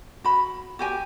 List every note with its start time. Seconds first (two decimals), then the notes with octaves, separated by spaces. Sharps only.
0.24 F#4 B5
0.79 F#4 G4 G#5